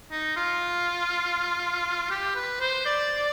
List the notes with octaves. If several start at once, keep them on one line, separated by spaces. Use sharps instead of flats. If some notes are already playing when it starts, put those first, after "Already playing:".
D#4
F4
G4
B4
C5
D5